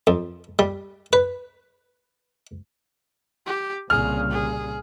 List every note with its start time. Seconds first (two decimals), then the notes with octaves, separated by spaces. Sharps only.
0.07 F2
0.59 G3
1.13 B4
3.47 G4
3.90 C2 A#2 C#3 G#4 F6
4.32 G#4